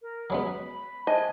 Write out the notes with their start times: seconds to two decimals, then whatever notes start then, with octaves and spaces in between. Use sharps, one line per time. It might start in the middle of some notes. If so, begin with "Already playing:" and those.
0.02 A#4
0.30 F#3 G#3 B3 B5
1.07 C5 D#5 E5 G#5 A5